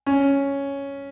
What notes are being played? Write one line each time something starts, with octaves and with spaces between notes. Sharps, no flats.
C#4